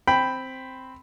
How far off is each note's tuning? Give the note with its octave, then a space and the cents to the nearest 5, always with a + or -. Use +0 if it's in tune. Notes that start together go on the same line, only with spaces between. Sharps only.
C4 +0 G5 +0 B5 +5